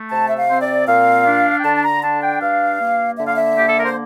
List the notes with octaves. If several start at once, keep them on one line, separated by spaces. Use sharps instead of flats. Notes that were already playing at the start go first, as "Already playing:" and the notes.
Already playing: A3
C3 A5
E5
F5
C4 C5
D5
A#2 F5
D4
G5
D3 A5
A5
A#5
D4 A5
G5
G2 F5
A#3
D3 E5
F5
E5
A#3 G4
A4
A#4
C5